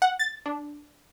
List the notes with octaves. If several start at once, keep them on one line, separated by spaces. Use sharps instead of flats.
F#5
A6
D4